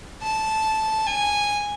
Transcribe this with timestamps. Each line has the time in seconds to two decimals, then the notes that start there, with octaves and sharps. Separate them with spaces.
0.22 A5
1.07 G#5